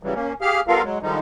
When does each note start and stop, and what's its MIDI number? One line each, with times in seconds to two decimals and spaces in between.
0.03 0.14 49
0.03 0.14 52
0.03 0.14 54
0.03 0.14 55
0.15 0.33 58
0.15 0.33 61
0.41 0.60 67
0.41 0.60 68
0.41 0.60 77
0.41 0.60 89
0.68 0.82 55
0.68 0.82 59
0.68 0.82 65
0.68 0.82 69
0.68 0.82 70
0.68 0.82 77
0.83 0.98 54
0.83 0.98 56
1.03 1.20 50
1.03 1.20 51
1.03 1.20 53
1.03 1.20 55
1.03 1.20 56
1.03 1.20 63